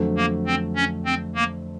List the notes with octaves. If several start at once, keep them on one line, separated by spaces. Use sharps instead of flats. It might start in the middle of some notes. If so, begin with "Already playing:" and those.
Already playing: F2 D3 F#3 A3
A#3
C4
C#4
C4
A#3